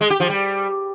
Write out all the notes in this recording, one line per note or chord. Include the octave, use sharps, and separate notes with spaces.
G#3
G4
F3
G3